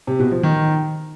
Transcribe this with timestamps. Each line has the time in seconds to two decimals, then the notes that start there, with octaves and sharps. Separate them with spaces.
0.07 C3
0.19 B2
0.31 F3
0.43 D#3